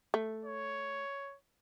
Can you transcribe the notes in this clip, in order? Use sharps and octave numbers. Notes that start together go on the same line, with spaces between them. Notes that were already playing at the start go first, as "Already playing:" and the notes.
A3
C#5